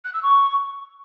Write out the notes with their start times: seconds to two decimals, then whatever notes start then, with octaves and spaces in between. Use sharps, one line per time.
0.04 F#6
0.13 E6
0.23 C#6